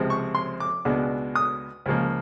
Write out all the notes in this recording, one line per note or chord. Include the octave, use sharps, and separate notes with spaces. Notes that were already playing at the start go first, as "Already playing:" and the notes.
Already playing: C#2 C3 F3 G#3 C4
C#6
C6
D6
C#2 B2 G#3 B3 D4
D#6
C#2 C#3 F3 A#3